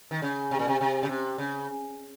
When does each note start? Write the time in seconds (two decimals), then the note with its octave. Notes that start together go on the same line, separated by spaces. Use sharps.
0.11 D#3
0.22 C#3
0.51 C3
0.59 A#2
0.68 C3
0.81 C3
1.03 C#3
1.09 C3
1.38 C#3